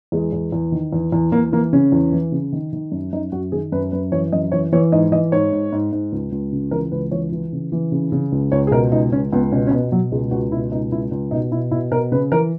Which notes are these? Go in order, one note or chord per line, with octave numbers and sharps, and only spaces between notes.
E2 G#3
E2
E2
D#3
E2
E2
E2 A#3
E3 A#3
C#3 C#4
E2
E3
C#3
D#3
D#3
F#2
F#2 D#4
F#2 F#4
D#3 G#4
F#2 B4
F#2 B4
E3 C#5
F#2 D#5
E3 C#5
E3 C#5
G#2 D#5
E3 D#5
G#2 C#5
G#2
G#2
G#2
C#2
C#2
C#3
E3 A#4
C#2 B4
E3 C#5
E3
C#3
E3
C#3
C#3
C#2
C#2 C#5
G#4
B2 A#4
C#2 D#4
C#2 C#4
C#2 B3
B2 C#4
C#4
B2 B3
B2 F#3
C#2 G#3
C#2 F#4
B2 E4
C#2 D#4
C#2 E4
C#2
B2 D#4
B2 E4
B2 E4
B2 A#4
C#3 B4
E3 A#4